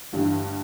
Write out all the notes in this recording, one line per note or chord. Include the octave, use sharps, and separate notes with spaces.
G1 G2 E3 G3